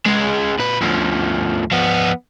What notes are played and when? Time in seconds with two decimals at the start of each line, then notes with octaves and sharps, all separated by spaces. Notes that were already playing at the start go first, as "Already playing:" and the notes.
0.06 C#2 G#3
0.59 A#2 B4
0.81 D2 F3
1.71 F3 B3